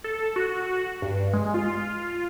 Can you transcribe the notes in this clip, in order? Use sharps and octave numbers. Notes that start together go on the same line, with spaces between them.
A4
F#4
G2
G#3
F4